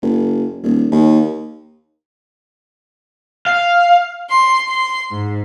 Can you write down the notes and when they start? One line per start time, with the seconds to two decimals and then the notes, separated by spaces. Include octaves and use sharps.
0.03 F#1
0.63 D#1
0.92 D#2
3.46 F5
4.31 C6
4.69 C6
5.11 G#2